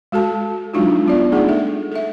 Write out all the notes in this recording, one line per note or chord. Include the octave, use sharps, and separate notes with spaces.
G#3 F#4 A4 A5
F#3 G#3 D4 D#4 F4 F#4
G3 B3 F4 D5
A3 D4 D#4 G#4 F#5
A4 E5
A4 E5